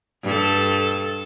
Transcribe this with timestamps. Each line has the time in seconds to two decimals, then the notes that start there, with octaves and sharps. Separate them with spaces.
0.24 G2 A4